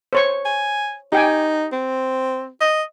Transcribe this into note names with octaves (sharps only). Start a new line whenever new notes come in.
C5 C#5 C#6
G#5
D#4 G4 G5 G#5
C4
D#5